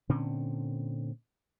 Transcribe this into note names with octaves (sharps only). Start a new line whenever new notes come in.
A#2 D3 C4 C#4